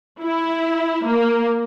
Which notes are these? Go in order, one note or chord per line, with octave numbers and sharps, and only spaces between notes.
E4
A#3